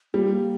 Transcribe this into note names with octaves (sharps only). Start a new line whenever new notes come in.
G3 A#3